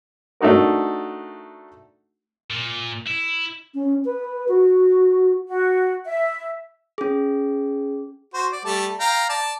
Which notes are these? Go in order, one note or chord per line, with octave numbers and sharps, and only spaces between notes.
A3 D4 D#4 F#4 A#4
A#2
E4
C#4
B4
F#4
F#4
E5
C#4 G#4
F#4 C5
D5
G3 A3 A5
F5 G5 A#5
D5 A5